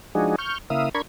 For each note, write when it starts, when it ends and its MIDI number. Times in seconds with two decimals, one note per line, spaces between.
0.15 0.36 53
0.15 0.36 56
0.15 0.36 62
0.15 0.36 63
0.15 0.36 66
0.15 0.36 68
0.38 0.58 85
0.38 0.58 89
0.38 0.58 91
0.70 0.89 49
0.70 0.89 58
0.70 0.89 64
0.70 0.89 76
0.70 0.89 77
0.70 0.89 87
0.95 1.02 62
0.95 1.02 70
0.95 1.02 83
0.95 1.02 85
0.95 1.02 92